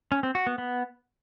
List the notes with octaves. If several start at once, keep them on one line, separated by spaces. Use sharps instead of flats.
C#4
C4
F#4
B3
B3